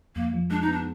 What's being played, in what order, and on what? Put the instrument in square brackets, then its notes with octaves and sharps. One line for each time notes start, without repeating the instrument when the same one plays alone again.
[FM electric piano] F2 [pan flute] A#3
[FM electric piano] F3
[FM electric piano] G#3 [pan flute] D4
[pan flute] D#4
[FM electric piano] B3 [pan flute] D4